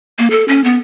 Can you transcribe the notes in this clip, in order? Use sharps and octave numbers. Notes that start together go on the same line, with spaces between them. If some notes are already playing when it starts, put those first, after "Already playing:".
A#3
A4
C#4
B3